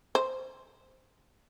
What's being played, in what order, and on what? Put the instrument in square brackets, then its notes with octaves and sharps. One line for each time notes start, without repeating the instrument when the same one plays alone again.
[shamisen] C5